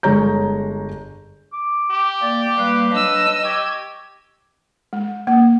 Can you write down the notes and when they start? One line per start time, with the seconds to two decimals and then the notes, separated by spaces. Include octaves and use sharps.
0.03 G1 G#3 C#5 A#5 G6
1.53 D6
1.91 G4
2.22 A#3 D5
2.58 G3 A#3 B4 F5
2.92 F#3 D4 D#5 E6
3.44 G4 C#6 G#6
4.93 G#3
5.27 A#3